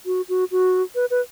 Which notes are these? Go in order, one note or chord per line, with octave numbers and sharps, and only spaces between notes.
F#4
F#4
F#4
B4
B4